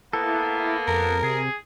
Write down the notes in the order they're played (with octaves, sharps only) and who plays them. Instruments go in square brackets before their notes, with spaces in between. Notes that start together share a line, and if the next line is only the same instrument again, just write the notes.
[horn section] A#3 B3 [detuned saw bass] E4 [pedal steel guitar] A4
[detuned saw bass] F2 [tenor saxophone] A#4
[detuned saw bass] C3 [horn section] G#4